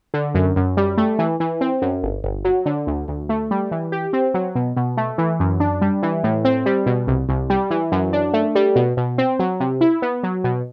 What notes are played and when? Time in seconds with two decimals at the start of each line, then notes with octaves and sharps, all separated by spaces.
0.14 D3
0.35 F#2
0.56 F#2
0.77 G3
0.97 A3
1.19 E3
1.40 E3
1.61 C4
1.82 F#2
2.03 G1
2.24 G1
2.45 F#3
2.66 D3
2.87 D2
3.08 D2
3.29 A3
3.51 G3
3.72 E3
3.92 G4
4.13 C4
4.34 F#3
4.55 B2
4.77 B2
4.97 A3
5.18 E3
5.40 F#2
5.60 D4
5.81 G3
6.03 E3
6.24 A2
6.45 C4
6.66 G3
6.86 B2
7.08 C2
7.29 C2
7.50 G3
7.71 E3
7.92 F#2
8.13 D4
8.34 A3
8.55 G3
8.76 B2
8.97 B2
9.18 C4
9.39 F#3
9.60 C3
9.81 E4
10.02 B3
10.23 F#3
10.44 B2